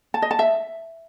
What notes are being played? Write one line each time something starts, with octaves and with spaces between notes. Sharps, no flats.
A5
D#5
A5
E5